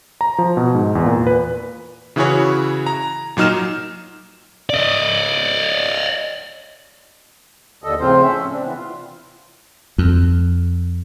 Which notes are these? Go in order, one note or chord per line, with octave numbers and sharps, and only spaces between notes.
A#5
F3
B2
G#2
E2
A#2
B4
C#3 E3 E4 F#4 G#4 C#5
A#5
A#2 F#3 D#4 F6 E7
D5 D#5
D#2 D3 A4 D#5
A2 C#3 F3 C4 F4 C5
C#4 E5
C4 D4
C3 E3 B3
F4
F2